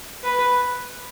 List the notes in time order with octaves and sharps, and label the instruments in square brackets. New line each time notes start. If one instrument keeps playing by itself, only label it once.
[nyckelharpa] B4